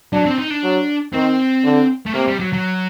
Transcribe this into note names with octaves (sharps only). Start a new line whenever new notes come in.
F#3 D4
C4
D#4
D4
F#3
D#3 C4
D3
A3
C3 A#3
G3
F#3
F#3